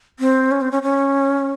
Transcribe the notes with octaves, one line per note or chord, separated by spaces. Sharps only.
C4
C#4
C4
C#4
C#4